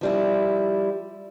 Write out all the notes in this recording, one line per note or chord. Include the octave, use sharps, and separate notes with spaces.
F3 G3 E4